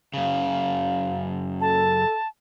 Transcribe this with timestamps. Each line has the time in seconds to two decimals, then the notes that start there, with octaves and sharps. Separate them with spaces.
0.14 F#2 C#3 F5
1.61 A4 A5